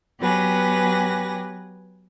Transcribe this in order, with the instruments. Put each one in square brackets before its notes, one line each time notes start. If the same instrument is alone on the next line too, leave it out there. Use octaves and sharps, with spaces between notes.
[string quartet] F#3 B3 G4 B4 G#5 A#6